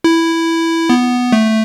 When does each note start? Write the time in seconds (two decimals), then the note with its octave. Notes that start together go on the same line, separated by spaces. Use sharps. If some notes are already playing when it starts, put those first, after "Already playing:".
0.04 E4
0.90 B3
1.32 A3